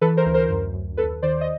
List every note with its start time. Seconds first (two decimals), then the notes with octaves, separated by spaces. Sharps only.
0.01 E3 A4 B4
0.17 A#4 C5
0.26 D2
0.34 A#4 C5
0.49 F#2
0.73 F#2
0.97 D#2 A4 B4
1.22 D#3 C5 D5
1.41 D#5